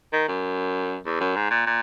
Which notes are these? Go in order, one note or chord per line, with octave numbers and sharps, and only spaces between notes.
D#3
F#2
E2
F#2
G#2
A#2
A#2